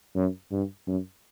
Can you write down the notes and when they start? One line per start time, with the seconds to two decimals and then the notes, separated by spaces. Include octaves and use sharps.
0.16 F#2
0.51 G2
0.87 F#2